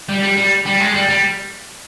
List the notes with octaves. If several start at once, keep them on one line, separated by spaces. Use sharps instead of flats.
G3
G3
G3
G3
G#3
G3
G3